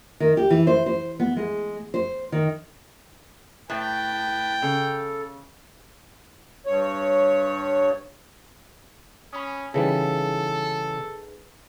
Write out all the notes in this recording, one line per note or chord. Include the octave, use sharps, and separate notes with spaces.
D#3
G4
E3
C5
C5
B3
G#3
C5
D#3
A2 B4 G5 A5
C#3 A4
G2 C#5
C#4 B5 D#6
C#3 E3 G3 D#4 G#4 A4 B4